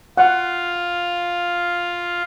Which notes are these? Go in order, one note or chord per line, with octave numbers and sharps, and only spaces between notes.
F4 F#5